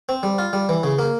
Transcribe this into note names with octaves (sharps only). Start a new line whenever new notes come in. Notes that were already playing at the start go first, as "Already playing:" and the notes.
C4
G3
F4
G3
E3
C#3
A#3